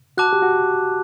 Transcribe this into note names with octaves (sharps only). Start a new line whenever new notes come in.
F#4 A5 D6 F#6
G4
F#4